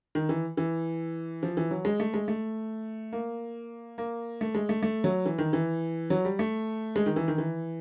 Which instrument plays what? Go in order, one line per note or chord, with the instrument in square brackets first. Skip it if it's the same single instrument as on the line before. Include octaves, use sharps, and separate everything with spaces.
[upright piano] D#3
E3
E3
F3
E3
F#3
G#3
A3
G#3
A3
A#3
A#3
A3
G#3
A3
A3
F#3
E3
D#3
E3
F#3
G3
A3
G#3
D#3
E3
D#3
E3